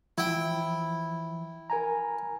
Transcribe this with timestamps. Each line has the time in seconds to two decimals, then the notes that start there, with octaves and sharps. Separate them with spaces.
0.18 E3 F3 E4 G5
1.70 A#4 G#5 A#5